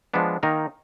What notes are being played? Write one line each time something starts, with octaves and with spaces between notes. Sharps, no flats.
F3 G#3 B3 D4
D#3 A#3 D#4 A#4